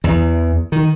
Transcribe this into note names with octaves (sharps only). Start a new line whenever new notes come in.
E2 E3
D#3